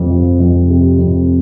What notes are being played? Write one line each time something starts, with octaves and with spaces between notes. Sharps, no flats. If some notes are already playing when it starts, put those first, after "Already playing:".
Already playing: F2 C3
F3
F2
C3
F2